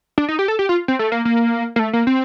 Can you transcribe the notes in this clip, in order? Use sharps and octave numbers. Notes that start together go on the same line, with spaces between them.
D4
D#4
G4
A4
G4
F4
C4
A3
A#3
A#3
A#3
A3
A#3
C4